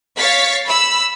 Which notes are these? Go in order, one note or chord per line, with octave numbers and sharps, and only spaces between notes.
C#5 F5 C#6 A6 B6
B5 E6